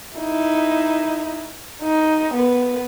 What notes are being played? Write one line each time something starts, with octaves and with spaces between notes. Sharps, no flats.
D#4 E4
D#4
B3 B4